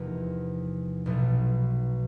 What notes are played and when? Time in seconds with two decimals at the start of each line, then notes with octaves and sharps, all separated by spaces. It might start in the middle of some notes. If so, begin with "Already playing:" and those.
Already playing: E2 C3 F3 A#3 D#4
1.06 B1 B2 F#3 A3